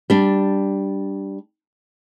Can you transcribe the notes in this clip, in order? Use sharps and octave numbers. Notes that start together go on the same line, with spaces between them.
G3 D4